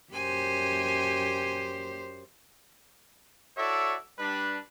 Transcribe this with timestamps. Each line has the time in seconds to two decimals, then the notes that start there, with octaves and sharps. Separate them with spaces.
0.13 F#2 G4 C5 G#5
3.57 E4 F#4 A4 C#5 D5 E5
4.19 G3 D4 B4